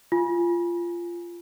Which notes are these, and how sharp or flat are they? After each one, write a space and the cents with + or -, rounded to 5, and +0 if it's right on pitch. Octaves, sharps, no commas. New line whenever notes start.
F4 -15 G#5 +0